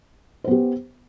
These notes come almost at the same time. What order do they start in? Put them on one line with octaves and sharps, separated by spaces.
C5 B3 G4